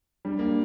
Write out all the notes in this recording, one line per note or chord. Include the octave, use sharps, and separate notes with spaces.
G3 D4
A#3